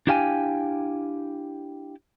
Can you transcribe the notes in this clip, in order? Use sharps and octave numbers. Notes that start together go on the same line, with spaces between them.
D4 E4 G4 F5 G5 G#5